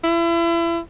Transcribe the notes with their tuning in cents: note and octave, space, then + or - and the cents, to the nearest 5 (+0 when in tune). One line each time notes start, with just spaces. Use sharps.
E4 +35